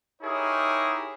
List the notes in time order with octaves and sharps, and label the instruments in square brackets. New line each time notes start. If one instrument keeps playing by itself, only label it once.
[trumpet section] D#4 E4 G4 G#4 A#4 C#5